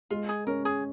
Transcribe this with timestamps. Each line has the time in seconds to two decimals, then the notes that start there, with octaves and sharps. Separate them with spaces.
0.10 G#3 F4
0.29 G#4
0.47 C#4 A#4
0.65 G#4